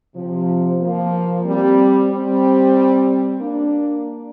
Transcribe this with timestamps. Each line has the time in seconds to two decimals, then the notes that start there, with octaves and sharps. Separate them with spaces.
0.15 C3 F3
0.80 F3 A#3
1.45 G3 C4
2.10 G3 C4
3.40 A#3 D4